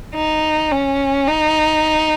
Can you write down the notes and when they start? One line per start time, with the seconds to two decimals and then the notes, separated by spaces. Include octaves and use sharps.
0.15 D#4
0.72 C#4
1.28 D#4